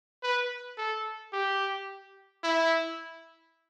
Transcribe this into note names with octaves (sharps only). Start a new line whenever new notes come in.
B4
A4
G4
E4